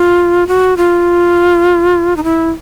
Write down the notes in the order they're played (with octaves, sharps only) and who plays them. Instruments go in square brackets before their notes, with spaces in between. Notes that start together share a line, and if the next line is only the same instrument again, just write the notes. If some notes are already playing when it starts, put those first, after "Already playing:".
Already playing: [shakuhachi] F4
F#4
F4
D#4
E4